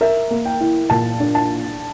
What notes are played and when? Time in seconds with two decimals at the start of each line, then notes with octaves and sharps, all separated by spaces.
0.01 A#4 E5
0.31 A#3
0.45 G5
0.61 E4
0.90 A#2 A5
1.20 D4
1.35 A5